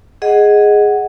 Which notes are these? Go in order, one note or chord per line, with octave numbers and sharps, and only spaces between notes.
G#4 D#5 F#5